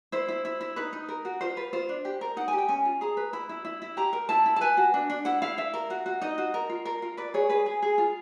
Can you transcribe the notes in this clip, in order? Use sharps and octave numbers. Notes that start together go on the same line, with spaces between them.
E4 C5
E4
E4
E4
D#4 B4
D#4
A#4
F#4
F4 C5
F4 B4
F4 C5
D4
G4
A#4
D#4 F#5
G#5
G4
G5
C#4 G#5
F4
G#4 A#5
B4
E4 B5
E4
E4
E4
G4 A#5
A#4
E4 A5
E4
A5
B4 G#5
F#4
D4
D4
E4 F#5
E4 F5
E4 E5
A#4
F#4
F#4
D#4 D#5
F#4
A#4
F4
A#4
F4
B4 D5
G#4 C#5
G#4 B4
G#4
G#4
F4